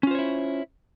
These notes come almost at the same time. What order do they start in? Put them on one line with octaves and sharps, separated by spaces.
C#4 F4 C5 C#5 E4